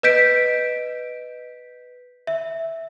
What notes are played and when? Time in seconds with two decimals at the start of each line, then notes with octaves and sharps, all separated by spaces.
0.03 B4 D#5 G6 B6 D7
2.27 E5